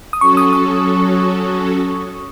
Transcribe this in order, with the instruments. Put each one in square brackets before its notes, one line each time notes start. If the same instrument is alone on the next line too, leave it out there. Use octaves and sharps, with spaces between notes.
[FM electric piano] D#6
[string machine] F#3 C#4 F#4 A4 [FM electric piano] C#6
[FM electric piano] D#6
D#6